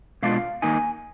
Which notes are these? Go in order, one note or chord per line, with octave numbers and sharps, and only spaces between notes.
B2 G#3 D4 F4 F5
D#3 A#3 D#4 G#5